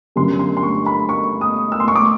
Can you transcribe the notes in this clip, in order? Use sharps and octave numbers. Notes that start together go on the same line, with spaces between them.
G1 F#2 D3 G3 C6
C6
C6
C#6
B5
C#6
D#6
E6
C6
C#6
D6